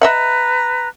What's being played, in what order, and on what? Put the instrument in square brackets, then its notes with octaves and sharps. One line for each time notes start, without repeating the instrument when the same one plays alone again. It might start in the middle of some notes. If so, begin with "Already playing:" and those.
[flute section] B4 A#5 [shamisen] D#5 E5 F#5